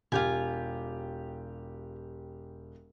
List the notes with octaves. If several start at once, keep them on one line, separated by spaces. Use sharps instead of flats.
E1 F4 G4 G#5